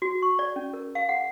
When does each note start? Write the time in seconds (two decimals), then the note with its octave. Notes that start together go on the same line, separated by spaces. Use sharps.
0.02 F#4
0.22 C#6
0.39 D5
0.56 C#4
0.74 A#4
0.95 F5
1.09 F#5